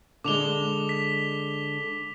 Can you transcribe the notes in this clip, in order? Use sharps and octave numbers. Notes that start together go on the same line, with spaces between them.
D3 G#3 D6 F7 G7
B6